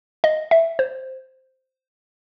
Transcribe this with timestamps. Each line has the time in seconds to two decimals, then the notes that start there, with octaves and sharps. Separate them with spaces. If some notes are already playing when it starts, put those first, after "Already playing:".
0.24 D#5
0.51 E5
0.79 C5